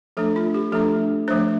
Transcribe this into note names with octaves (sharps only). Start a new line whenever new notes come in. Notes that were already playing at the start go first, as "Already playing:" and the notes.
F3 A3 D4 A4
F4
G4
F3 A3 D4 A4
F3 A3 D4 C5